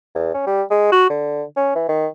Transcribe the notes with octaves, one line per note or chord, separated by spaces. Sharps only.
E2
C#4
G3
G#3
F#4
D3
C#4
E3
D#3